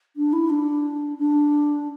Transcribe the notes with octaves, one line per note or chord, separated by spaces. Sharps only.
D4
E4
D4
D4